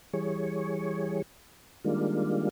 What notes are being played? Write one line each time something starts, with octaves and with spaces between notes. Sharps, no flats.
E3 G3 G#4 C#5
D#3 G3 G#3 A#3 D4 F4